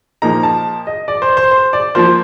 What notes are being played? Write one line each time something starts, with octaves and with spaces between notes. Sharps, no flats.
A#2 F3 A#3 D#4 A#5
A5
D#5
D5
C5
C5
C5
D5
F3 A#3 F4 C5